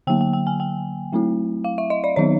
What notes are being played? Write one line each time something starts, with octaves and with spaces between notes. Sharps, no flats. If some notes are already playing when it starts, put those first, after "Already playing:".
D3 F#3 A#3 G5
G5
G5
G#5
G5
F#3 A3 C4 E4
F5
E5
D#5
D5
D#3 F#3 B3 D#4 C#5